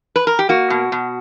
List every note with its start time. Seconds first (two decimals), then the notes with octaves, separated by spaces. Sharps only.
0.16 B4
0.27 A#4
0.39 G4
0.49 A#3 F#4
0.70 B2
0.92 B2